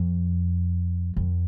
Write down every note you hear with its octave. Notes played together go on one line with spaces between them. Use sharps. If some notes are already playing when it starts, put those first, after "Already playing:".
Already playing: F2
F2